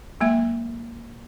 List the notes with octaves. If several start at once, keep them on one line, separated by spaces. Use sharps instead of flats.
F#3 G#3 A#3 E5